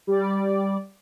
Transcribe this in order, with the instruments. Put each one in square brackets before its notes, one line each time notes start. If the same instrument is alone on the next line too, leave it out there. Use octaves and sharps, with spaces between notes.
[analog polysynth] G3 D5